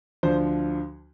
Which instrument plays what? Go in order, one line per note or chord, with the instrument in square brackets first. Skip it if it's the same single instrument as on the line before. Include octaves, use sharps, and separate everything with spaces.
[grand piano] D2 D3 F3 C5